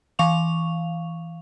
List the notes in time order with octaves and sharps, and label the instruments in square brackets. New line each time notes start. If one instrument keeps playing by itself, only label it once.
[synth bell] E3 F5 C#6 F7